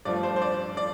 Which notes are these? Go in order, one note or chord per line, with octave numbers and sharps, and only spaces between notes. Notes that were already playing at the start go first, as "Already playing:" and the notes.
G2 F3 A3 D5
C5
C5
D5
D5